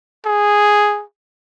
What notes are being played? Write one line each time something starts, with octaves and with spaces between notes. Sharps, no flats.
G#4